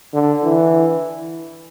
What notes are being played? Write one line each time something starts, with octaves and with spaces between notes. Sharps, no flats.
D3
E3